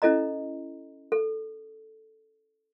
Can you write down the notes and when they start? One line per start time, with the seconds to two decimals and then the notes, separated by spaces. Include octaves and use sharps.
0.02 C#4 E4 A4 D#5 A#5
1.12 A4